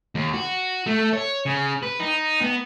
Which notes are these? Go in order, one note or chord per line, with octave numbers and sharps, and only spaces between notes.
D#2
F#4
A3
C#5
C#3
B4
D#4
B3